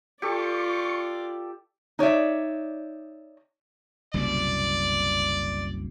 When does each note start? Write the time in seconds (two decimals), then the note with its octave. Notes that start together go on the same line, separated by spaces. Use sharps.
0.22 F4 G4 A4 D5 C#6
1.99 D#4 C#5 D5 E5
4.14 F#1 C2 B2 D5